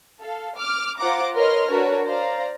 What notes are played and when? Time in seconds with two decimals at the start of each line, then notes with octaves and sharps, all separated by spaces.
0.22 A4 F5
0.58 D6 F6
0.98 F4 C5 F#5 A#5 D6
1.35 A#4 B4 C#5 D#5 C6 F6
1.68 D4 F#4 A#4 B4 C#5
2.07 C5 D5 F5 A#5